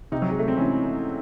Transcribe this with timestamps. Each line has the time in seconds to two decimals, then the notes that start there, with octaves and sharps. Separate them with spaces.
0.12 C3 D#4
0.22 F#3
0.31 G#3
0.39 A3
0.48 C4
0.57 E3 C#4